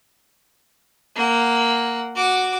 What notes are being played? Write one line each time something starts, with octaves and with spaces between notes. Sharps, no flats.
A#3 F#5
F#4 D6